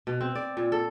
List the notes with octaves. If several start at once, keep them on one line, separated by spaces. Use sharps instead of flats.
B2
C4
D5
A#2
A4